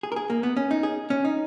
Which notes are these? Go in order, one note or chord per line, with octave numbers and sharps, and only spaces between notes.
G#4
A#4
G#4
A#3
B3
C#4
D#4
G#4
C#4
D#4